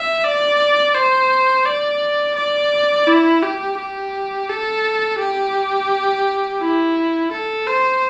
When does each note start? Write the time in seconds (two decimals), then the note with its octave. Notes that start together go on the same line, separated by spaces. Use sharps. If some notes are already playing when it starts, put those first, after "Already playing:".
Already playing: E5
0.24 D5
0.94 C5
1.66 D5
2.36 D5
3.07 E4
3.43 G4
3.78 G4
4.49 A4
5.19 G4
6.61 E4
7.32 A4
7.67 C5